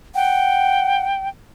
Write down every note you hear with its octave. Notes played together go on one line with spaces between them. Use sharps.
F#5 G5